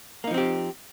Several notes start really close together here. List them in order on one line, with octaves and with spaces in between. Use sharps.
A#3 D#4 F3 C4 G4